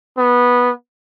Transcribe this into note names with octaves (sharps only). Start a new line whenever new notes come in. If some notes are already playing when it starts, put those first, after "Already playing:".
B3